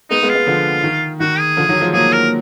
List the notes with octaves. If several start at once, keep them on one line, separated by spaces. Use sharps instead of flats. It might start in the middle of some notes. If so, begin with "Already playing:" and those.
G#3 B3 D#4
G#3 B3
F4
G#3 B3
D3 F3
D#3
D#3 F#4
G#4
D3 F3
D#3 F#3
F3 G#3
F#3 A#3 G#4
A#4